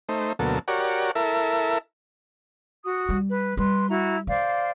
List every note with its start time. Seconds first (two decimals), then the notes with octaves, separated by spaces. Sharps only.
0.09 A3 D#4 C5
0.39 D2 B2 F#3 A#3 A4
0.68 F#4 G4 A#4 C#5 D5 F#5
1.15 E4 A4 A#4 E5
2.83 F#4 D#6
3.09 G3
3.28 B4
3.57 G3 B4 C6
3.88 E4 F#4 A#5
4.27 D3 C5 D5 F5